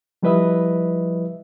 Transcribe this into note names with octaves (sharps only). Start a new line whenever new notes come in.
F3 G3 E4 B4 D#5 E5